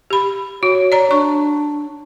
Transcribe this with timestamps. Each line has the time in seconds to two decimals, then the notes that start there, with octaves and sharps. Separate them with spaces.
0.10 G4 B5
0.63 F#4 C#5
0.92 D5 A#5
1.11 D4 C#6